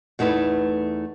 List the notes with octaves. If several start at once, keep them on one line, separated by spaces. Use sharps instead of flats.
E2 A3 D#4 E4 B4